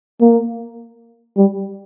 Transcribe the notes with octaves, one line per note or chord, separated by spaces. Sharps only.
A#3
G3